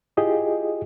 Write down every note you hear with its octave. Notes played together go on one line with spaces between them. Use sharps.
E4 F4 G4 G#4 D#5